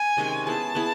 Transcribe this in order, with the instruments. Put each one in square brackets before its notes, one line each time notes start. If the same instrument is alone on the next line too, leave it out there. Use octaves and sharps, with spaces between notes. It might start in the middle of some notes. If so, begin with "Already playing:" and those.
Already playing: [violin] G#5
[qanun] C3 D#3 G#3 C#4
[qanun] B3 E4 G#4 [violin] A5
[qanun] B3 E4 G#4